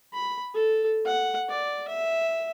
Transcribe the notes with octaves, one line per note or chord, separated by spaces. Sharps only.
B5
A4
F#5
D5
E5